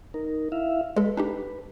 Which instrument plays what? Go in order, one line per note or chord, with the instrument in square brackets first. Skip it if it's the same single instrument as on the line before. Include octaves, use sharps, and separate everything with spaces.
[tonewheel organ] D#4 A#4
E4 E5 F5
[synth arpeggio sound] G#3 A4 [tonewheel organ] B4
[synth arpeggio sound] D4 D#4 G4